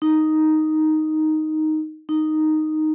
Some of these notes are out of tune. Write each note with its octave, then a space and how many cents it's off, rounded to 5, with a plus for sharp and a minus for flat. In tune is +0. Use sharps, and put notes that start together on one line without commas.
D#4 +0
D#4 -5